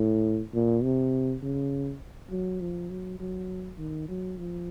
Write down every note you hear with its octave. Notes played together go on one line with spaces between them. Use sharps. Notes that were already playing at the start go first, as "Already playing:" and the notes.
Already playing: A2
A#2
C3
C#3
F#3
F3
F#3
F#3
D#3
F#3
F3